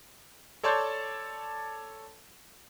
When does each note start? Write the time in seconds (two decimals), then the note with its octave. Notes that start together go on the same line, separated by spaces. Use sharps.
0.63 A4 C#5 D5 A5 C6 G6